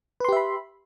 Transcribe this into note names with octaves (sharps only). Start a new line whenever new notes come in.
G4 B4 E5 B5 C6